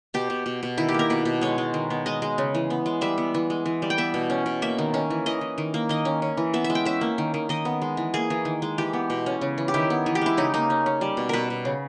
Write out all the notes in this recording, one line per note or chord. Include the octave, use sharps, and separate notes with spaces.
B2 G4
B2
B2
B2
D#3 E4
G4
A#3 A#4
B2 B4
B2
G#3 C#5
G#3
D#3
B3
G#3 D#5
G#3
C#3
E3
B3
G#3
G3 E5
B3
E3
G#3
E3
G3
G5
B3 E5
B2
C#4
B2
A#3 E5
D#3
C#4
E3
E3 D#5
E3
D#3
A#3
D#3 D#5
C#4
C#4
E3
B3 E5
E5
G#3
G5
C#4 E5
A#3
D#3
D#3
D#3 D#5
B3
G#3
E3
A#3 G#4
E3
D#3
G#3
E3 G4
B3
B2
C#4
C#3
E3
G4
D#3 E4
B3
E3
G4
G#3 E4
C#3 D#4
A#3 D#4
C#4
C#4
G3
B2
B2 A#4 B4
B2
C#3